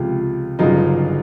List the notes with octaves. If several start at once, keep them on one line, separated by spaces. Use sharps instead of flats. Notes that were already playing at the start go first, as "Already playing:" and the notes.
Already playing: C#2 C3 F3 F4 G4
G1 F#2 C#3 F#3 D#4 F4